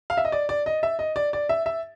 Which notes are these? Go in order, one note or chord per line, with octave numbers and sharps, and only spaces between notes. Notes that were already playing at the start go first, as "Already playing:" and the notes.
F5
E5
D#5
D5
D5
D#5
E5
D#5
D5
D5
E5
E5